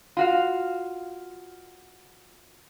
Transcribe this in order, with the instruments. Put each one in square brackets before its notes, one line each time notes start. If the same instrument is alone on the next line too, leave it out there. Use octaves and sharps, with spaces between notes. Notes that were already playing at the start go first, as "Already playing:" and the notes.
[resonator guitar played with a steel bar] F4 F#4 F5